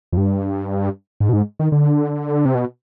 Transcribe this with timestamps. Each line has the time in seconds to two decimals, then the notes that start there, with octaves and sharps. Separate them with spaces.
0.12 F2
0.17 G2
1.20 G#2
1.29 B2
1.33 G#2
1.59 D#3
1.72 D3
2.45 C3
2.55 B2